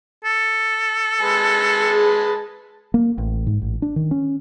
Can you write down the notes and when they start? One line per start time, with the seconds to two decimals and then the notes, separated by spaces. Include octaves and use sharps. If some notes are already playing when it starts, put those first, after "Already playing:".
0.24 A4
1.21 G#3 B4 A5
1.83 G#4
2.94 A#3
3.18 A1
3.47 G#2
3.62 A1
3.82 D4
3.96 D#3
4.11 C#4